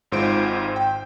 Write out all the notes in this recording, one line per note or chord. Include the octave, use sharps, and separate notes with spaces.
G#1 G#2 F4 C5 D7
G5